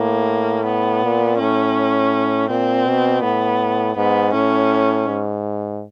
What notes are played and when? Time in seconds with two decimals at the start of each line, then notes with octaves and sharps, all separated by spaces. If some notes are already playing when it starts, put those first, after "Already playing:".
Already playing: A2 A#3
0.66 B3
1.03 A#2
1.39 A2 C#4
2.49 A#2 C4
2.87 B2
3.23 A2 B3
3.97 G#2 B3
4.33 A2 C#4
5.07 G#2